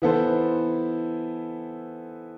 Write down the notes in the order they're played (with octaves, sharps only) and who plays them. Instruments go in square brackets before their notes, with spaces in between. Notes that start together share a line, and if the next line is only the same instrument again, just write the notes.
[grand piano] E3 B3 E4 A4 C5